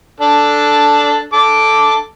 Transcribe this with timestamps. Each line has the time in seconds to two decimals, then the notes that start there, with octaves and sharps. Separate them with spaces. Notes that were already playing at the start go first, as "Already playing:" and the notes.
0.20 D4 A4
1.33 A4 D6